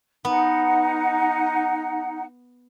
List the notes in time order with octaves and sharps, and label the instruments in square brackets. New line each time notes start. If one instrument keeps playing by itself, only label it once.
[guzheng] B3 [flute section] D#4 F#5